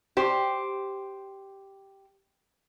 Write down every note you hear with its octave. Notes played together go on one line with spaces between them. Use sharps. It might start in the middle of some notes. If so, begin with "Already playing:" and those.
G4 C5